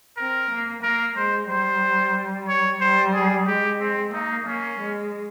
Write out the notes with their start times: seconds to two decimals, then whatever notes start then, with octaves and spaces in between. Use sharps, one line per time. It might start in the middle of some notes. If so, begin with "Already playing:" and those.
0.17 C4 A#4
0.50 A#3
0.83 A#3 A#4
1.16 G#3 C5
1.49 G3 C5
2.48 C#5
2.81 G3 C5
3.14 G#4
3.47 G#3 G4
3.80 C4
4.13 A#3 D#4
4.46 A#3 C#4
4.80 G#3